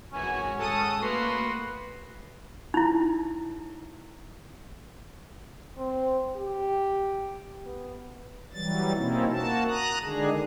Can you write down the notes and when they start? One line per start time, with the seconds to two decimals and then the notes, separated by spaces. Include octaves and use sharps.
0.13 G#1 F#2 E3 C#4 F#4 G#5
0.59 G#2 F#4 A4 A5 D#6
1.01 A3 A#3 F#4 B4 C6
2.74 D#4 E4
5.77 C4
6.37 G4
7.66 B3
8.53 E3 F#3 G3 A6
8.95 B2 A#3 C4 C#4 D#4 E4
9.30 A#3 F#4 A5
9.68 A#5 D#6 F#6
10.03 D3 D#3 G#3 D4 G#4